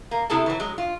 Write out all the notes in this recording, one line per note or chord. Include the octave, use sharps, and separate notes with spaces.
A#3
C3 E4 G#4 A4 A5
E3 F#3
F#3 G#3
F4